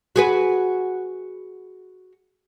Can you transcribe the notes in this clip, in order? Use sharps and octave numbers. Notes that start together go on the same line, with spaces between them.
F#4 G#4 B4